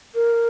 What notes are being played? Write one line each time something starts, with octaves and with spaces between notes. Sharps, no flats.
A#4